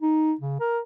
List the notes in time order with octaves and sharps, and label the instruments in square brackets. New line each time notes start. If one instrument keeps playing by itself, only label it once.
[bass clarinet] D#4
C#3
A#4